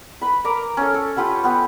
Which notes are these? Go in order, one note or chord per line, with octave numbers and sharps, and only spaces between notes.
B4 B5
A#4 A#5 D6
C#4 A4
A4
F4 G4 B4 F#5
B3 G4